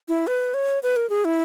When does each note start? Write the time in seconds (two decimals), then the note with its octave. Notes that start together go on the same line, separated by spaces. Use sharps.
0.08 E4
0.27 B4
0.54 C#5
0.83 B4
0.96 A#4
1.10 G#4
1.25 E4